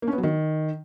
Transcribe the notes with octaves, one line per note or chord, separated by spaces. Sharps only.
A#3
C#4
B3
F#3
D#3